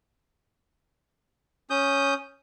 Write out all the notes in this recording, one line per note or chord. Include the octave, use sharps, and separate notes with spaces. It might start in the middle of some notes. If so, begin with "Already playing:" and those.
C#4 D#6 G6